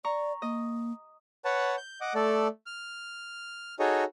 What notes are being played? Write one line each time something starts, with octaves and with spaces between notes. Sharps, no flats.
D5 A#5 C#6
A#3 D#5
B4 C#5 F#5 A5
G6
D#5 F#5 D6
A3 A4 D5
F6
D#4 F#4 G#4 A4 C#5 D#5